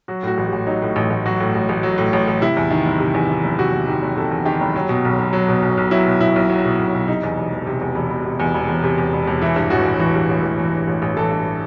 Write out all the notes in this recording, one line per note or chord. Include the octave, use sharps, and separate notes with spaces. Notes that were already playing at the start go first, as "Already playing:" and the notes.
F#3 F#4
A2 F#4
A1
G4
A1
F#3 D#4
A2
A1
A1
F#3 F#4
A2
A1
A1
F#3
A2
A1
A1
C3 E4
E2
D#3
F#1
C3
E2
D#3
F#1
C3 F#4
E2
D#3 G4
F#1
C3 A4
E2
D#3 G4
F#1
F#3
B2
B1
B1
F#3
B2
B1
B1
F#3 E4
B2
B1 E4
B1
F#3
B2
B1
B1
C3 D#4
E2
E1
E1
C3
E2
E1
E1
C3
E2
E1
E1
C3
E2
E1
E1
E3 E4
G2
A1 F#4
A1
E3 F#4
G2
A1
A1
E3
G2
A1
A1
E3 A4
G2